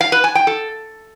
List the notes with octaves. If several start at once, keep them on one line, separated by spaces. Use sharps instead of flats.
F5
B4
G#5
G5
A4